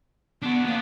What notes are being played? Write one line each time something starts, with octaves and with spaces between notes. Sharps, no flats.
B3 D4 F#4
A#3 B3 D4